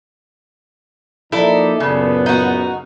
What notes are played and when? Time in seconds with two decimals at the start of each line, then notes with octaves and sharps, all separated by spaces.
1.32 F3 A#3 D#4 E4 A4 D5
1.80 F#1 A#2 C#3 B3
2.26 D#4 F#4